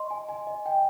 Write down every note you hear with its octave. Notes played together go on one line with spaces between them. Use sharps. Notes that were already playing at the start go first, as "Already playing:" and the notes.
Already playing: D#5 C6
G#5
G#5
D#5
G5